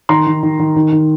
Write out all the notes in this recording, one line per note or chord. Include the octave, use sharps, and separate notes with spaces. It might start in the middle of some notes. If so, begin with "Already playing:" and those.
D#3 A#5 C6
D#3
D#3
D#3
D#3
D#3